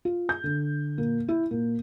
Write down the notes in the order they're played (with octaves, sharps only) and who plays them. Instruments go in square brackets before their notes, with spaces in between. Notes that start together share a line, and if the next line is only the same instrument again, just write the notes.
[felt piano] F4
G6
D3
A#2
E4
A#2